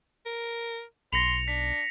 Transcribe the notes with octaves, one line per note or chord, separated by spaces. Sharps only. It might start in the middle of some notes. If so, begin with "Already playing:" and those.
A#4
B1 C6 A#6 C#7 F7
D4 B6